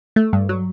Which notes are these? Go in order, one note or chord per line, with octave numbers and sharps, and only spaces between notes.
A3
G2
F#3